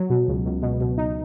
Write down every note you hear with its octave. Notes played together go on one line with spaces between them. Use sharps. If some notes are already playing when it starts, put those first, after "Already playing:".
Already playing: F#3
B2
C#2
C#2
B2
B2
D#4